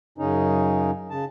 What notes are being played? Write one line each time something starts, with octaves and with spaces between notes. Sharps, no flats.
F#2 C#3 C#4 D#4
C#3 A5